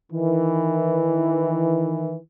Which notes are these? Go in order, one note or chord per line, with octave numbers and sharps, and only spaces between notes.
D#3 E3